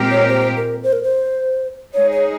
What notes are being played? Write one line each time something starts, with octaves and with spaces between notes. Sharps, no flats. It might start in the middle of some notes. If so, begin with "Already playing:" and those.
Already playing: A#2 G#3 C4 G4 A#4
C#5
C5
A#4
C5
A#4
C5
G#3 D#4 G#4 C#5
C#5